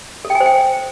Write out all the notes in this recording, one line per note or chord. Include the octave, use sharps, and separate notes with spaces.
A4
G5
G#5
C5
G5